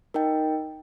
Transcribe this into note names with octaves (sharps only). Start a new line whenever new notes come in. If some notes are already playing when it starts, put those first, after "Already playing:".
D#4 A#4 D#5 G5